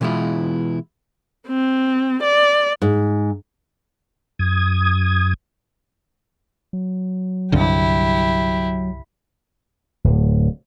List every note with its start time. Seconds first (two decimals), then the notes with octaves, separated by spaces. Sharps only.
0.01 B2 E3 G#3 B3 E4 F4
1.47 C4
2.23 D5
2.82 G#2
4.39 F#2 D#6 G#6
6.73 F#3
7.52 C2 G2 D3 E4 G4
10.04 D1